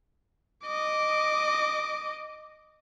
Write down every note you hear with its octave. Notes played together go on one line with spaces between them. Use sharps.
D#5 D6